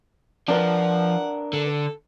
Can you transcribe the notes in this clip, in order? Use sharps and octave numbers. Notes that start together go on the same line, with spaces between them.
F3 D4 A#4 B4 F#5
D3 A4